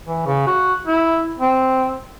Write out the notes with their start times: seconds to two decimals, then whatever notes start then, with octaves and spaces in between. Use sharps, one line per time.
0.06 E3
0.26 C#3
0.47 F#4
0.87 E4
1.39 C4